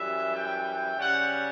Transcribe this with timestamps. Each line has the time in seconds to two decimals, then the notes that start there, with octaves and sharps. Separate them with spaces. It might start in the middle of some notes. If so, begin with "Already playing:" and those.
Already playing: F#2 E3 G3 E5
0.34 G5
0.97 C#3 G3 C#4 F#5